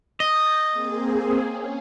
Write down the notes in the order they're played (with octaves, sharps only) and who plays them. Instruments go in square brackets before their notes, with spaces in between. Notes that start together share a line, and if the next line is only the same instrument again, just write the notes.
[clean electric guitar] D#5 [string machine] G6 A6
[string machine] A#3 C4 G#4
C#4